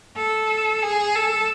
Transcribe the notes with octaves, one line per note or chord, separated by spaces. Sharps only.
A4
G#4
A4